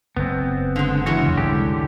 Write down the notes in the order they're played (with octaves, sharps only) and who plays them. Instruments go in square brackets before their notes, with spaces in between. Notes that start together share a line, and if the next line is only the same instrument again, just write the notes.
[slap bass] F#1 [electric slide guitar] B3 C4
[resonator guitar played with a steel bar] D3 G#3
[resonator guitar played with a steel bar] E3 G#3 C#4 [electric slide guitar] F#4
[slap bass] E2 C#3
[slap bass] C2 G#2 G3 [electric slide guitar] D3 G4